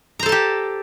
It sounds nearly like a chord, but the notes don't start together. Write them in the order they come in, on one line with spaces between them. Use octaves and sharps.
A#5 C5 A4 A5 G4